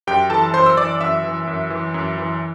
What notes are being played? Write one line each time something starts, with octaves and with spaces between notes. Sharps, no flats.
F#2 G4 G5
E3 A4 A5
F#2 C5 C6
E6
E3 D5 D6
F#2 E5 E6
E3
F#2
E3
F#2
E3